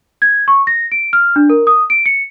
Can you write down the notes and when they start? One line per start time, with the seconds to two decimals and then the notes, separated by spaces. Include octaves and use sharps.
0.22 G#6
0.48 C#6
0.67 A#6
0.92 D7
1.13 F6
1.36 D4
1.50 A#4
1.67 D#6
1.90 D7
2.06 C#7